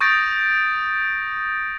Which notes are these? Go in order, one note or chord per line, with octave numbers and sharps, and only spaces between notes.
C#6 D#6 G6 A6 A#6 D7